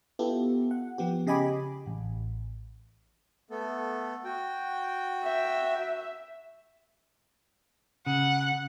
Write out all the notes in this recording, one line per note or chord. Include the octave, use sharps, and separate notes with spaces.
B3 E4 F4 G4 A4
F#5
F3 B3 G4
C#3 G4 D#5 G#5 B5 D6
A1
A3 B3 A4
F#4 G5
E5
C#3 F#5